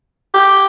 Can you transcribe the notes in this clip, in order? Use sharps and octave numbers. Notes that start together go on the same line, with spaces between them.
G4